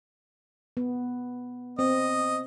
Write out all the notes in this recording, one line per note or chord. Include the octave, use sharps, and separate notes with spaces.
B3
C4 D#5